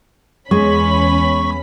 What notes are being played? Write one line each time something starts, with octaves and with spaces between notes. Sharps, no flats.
E2 G#3 C#4 B5 C#6